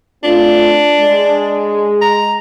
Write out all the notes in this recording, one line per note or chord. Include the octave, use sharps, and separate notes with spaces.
A3 C4 D4 F4
G#3
A#5